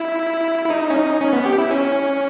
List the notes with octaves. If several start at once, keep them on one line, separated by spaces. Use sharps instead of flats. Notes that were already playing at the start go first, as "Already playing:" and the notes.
Already playing: E4
E4
D#4
C#4
D#4
C#4
B3
G4
E4
C#4